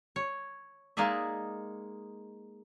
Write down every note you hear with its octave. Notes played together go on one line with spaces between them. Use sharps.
C#5
G#3 A#3 D#4 G#4 D5 E5